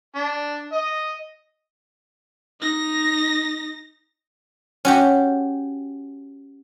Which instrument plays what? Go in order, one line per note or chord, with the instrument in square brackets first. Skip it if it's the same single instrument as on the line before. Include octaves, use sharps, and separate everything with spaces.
[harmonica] D4
D#5
[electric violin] D#4 A#6
[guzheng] C#4 F#4 G4